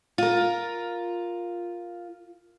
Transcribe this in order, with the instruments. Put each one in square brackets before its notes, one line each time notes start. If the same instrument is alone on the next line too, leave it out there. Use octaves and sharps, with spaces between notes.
[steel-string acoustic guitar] F4 A#4